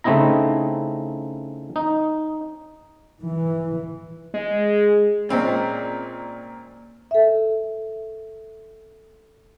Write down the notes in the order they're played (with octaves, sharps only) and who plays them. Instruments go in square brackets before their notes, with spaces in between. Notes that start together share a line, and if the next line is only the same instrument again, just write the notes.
[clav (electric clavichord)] C#3 A3 C4 D#4 E4 A#5
D#4
[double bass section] E3
[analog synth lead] G#3
[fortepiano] A#2 G#3 C4 C#4
[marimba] A4 E5